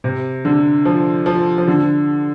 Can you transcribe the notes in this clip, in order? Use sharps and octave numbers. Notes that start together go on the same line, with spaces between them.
C3
D3
F3
F3
F3
D3